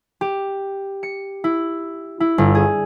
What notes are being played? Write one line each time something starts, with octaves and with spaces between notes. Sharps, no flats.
G4
C#7
E4
E4
G1
G#4